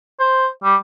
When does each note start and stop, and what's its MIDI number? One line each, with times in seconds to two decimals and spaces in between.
0.19 0.46 72
0.63 0.75 55